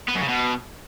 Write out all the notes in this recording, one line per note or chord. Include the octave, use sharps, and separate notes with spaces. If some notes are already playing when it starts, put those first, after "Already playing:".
B3
F#2
C#3
B2